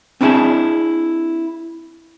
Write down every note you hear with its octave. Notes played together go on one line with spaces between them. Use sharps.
C4 D4 E4 F#4 G#4 A5